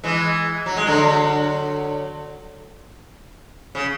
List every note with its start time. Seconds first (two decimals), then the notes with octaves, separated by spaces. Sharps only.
0.04 E3 G#3
0.66 F#3
0.76 G#3
0.87 D3 F#3
3.75 C#3